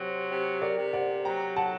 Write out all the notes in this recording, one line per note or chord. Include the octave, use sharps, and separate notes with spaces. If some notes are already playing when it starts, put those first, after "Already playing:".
Already playing: C3 F#3 C5
C3
A#4 D5
C3
D5 F#5
F#3 G5 A#5
F#5 A5